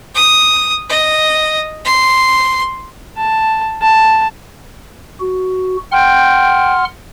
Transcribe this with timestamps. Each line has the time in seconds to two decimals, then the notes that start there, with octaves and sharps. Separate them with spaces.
0.15 D#6
0.89 D#5
1.85 C6
3.17 A5
3.82 A5
5.20 F#4
5.92 F#5 G5 C6 F6